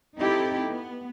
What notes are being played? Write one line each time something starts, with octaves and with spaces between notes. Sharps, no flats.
C4 D#4 E4 G4 A4
B3